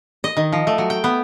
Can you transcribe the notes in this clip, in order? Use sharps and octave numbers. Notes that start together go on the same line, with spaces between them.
D#5
D#3
F3
A3
F#3
G5
B3